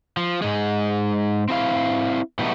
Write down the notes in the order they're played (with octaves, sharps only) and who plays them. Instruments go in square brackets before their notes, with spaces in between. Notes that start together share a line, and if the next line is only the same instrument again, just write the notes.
[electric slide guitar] F3
G#2 G#3
C4 E4 F5
B2 E3 G3 A3 B3 D#4